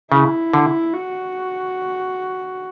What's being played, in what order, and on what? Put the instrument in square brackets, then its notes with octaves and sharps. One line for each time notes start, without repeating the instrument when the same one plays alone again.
[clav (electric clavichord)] C#3 [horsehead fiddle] E4
[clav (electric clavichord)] D3
[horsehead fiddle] F#4